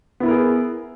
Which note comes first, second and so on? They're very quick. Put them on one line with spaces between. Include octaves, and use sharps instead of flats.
B3 E4 B4 A#4 G#4